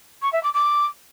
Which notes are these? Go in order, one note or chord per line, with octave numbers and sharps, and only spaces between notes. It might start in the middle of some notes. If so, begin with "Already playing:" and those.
C#6
E5
D6
D6